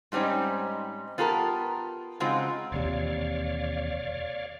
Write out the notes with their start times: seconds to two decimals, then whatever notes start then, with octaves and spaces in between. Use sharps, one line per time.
0.12 G#2 G3 C4 C#4 D#4
1.18 B3 F4 G4 A4 A#4
2.20 C#3 G#3 C4 D#4 F4 F#4
2.72 E1 D#2 C3 C#5 D5 F5